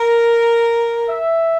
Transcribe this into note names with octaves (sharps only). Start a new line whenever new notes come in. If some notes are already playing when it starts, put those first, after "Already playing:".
Already playing: A#4
E5